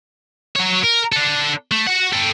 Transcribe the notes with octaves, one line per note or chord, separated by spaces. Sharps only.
F#3 C#5
A#4
D4 A4
A3
F#4 F#5
A4 G5